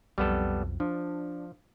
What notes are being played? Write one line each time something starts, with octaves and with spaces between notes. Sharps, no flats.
B1 F2 G3 B3 A4
F3 D4